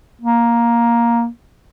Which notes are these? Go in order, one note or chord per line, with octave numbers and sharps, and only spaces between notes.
A#3